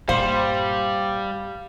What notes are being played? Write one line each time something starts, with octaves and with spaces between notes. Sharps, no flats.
G2 A#2 G3 C5 F5 B5